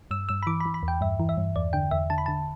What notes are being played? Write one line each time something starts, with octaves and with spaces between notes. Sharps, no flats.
G2 E6
G2 E6
B5
E3 D6
B5
E3
B5
E2
G5
G2 E5
E3
E5
G2
E2 D5
D3 G5
E2 E5
D3 A5
B5
D3 A5